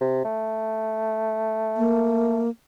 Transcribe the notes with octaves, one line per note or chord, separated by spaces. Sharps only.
C3
A3
A#3